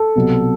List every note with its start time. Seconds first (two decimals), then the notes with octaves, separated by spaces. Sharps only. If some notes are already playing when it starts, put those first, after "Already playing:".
Already playing: A4
0.16 C2 B2 F#3